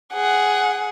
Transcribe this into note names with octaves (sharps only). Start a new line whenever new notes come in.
G#4 F#5